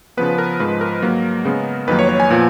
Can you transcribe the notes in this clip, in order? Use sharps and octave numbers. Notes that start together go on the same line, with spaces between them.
C#3 F3 B3 B4
A#4
G#2 F3 G#3 B4
A#4
G#2 F#3 A#3
C#3 G#3 B3
F2 D#3 F#3 A#3 B4
C#5
C#5
G#5
A#2 F3 B3